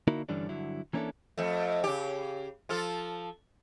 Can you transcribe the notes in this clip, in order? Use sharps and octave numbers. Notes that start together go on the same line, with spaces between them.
D3 A#3 D#4 E4 F#4 A#4
G2 D3 E3 G3 C#4 D4
G2 D3 F#3 E4
E3 A#3 C#4 D4 E4 A4
F2 A3
C#3 G4
F3 F4 A4